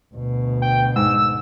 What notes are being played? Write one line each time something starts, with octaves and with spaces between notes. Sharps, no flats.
D2 B2
G5
G#2 E6